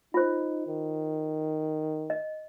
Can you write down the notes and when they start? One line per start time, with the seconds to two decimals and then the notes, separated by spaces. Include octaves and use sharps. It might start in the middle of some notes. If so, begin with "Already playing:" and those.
0.14 D#4 F4 C5
0.66 D#3
2.10 D#5